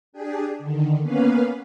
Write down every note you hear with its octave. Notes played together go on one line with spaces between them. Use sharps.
D4 G4 G#4
D3 D#3
A#3 B3 C#4 B4 F5